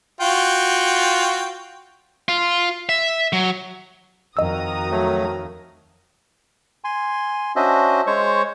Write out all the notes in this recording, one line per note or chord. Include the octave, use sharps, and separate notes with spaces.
F4 F#4 G5
F4
E5
F#3
F2 D#3 F#4 D#5 A#5 D#6 E6
F#3 A3
G#5 C6
C#4 D4 F#4 C5 D#5 E5
G#3 C5 C#5 C#6